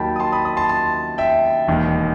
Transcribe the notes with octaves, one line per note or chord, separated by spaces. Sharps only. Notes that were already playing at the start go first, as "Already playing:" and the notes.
Already playing: D#2 D#3 F#3 G5 A5 B5
D#6
A5 C6
B5 D#6
B5 D#6
A5 C6
A5 C6
E5 G5
E1 D#2 D#3